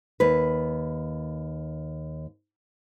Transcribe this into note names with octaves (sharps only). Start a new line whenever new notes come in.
D#2 B4